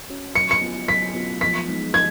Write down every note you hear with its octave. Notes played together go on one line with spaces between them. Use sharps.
C#4 F#4 C#5
F#3 C#7
C#7
B3 F4
F#3 B6
B3 F4
F3 B6
G#3 B3 D#4
F3 G#6